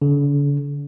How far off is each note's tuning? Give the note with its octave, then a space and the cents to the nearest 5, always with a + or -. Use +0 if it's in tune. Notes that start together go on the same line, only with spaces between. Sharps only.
D3 -45